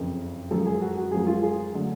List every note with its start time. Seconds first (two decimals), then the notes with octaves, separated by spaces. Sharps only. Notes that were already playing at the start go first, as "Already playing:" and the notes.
Already playing: F#1 F2 C#3
0.51 F#2 F3 G#3 A4
0.66 G#4
0.81 F#4
0.97 F#4
1.12 F#2 F3 G#3 G#4
1.27 F4
1.43 G#4
1.73 D3 F#3 A3